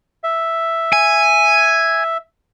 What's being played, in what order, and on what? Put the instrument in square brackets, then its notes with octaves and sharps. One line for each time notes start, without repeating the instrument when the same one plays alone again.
[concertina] E5
[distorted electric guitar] G#5